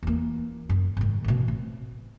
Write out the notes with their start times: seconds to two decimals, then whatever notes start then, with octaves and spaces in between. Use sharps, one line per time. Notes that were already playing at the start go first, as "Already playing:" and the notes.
0.03 E2 A#3
0.69 F#2
0.97 G#2 D#3
1.24 A1 B2
1.48 C4